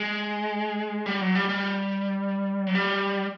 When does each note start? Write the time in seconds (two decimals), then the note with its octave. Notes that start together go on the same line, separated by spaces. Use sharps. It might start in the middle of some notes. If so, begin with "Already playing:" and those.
Already playing: G#3
1.06 G3
1.21 F#3
1.35 G3
1.49 G3
2.67 F#3
2.75 G3